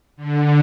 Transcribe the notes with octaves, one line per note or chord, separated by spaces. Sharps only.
D3